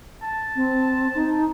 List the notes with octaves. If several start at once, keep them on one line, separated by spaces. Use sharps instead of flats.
A5
C4
D#4